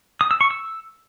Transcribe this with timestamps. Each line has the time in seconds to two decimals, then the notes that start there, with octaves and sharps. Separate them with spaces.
0.21 D#6
0.31 E6
0.41 C#6
0.51 E6